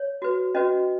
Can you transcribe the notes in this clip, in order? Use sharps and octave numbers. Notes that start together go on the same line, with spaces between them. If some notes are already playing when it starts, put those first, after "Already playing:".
Already playing: C#5
F#4 B4
C#4 F#4 B4 D#5